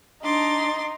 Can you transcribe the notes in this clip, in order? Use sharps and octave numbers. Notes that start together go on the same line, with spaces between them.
D4 D#4 C6 D6 A6